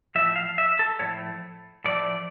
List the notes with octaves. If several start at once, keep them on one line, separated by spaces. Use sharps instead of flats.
A2 F3 A3 E5
F5
E5
A4
A2 F3 A3 C#5
A2 F3 A3 D5